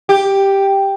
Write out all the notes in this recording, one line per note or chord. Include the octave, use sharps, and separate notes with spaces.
G4